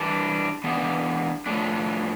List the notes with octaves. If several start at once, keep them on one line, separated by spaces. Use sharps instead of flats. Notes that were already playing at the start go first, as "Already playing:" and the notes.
Already playing: E3 G3 D4
E3 B3 D4 G4
A2 F3 A3 D4